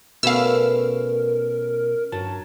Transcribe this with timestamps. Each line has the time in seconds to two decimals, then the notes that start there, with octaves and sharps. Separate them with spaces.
0.23 B2 A3 B3 C#4 A#4 E5 F5 E6
2.12 G2 F#3 A5